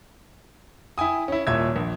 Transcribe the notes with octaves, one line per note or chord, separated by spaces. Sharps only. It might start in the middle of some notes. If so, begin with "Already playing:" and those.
E4 G5 G#5 D#6
C#4 E4
D#1 A#2 C#5 E5 E6 G#6
A#1